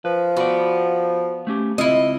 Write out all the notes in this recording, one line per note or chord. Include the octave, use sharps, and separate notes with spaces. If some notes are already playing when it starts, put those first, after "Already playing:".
F3 B4
B3 F#4 D5
A3 C#4 G4
C#2 C4 E4 F4 D#5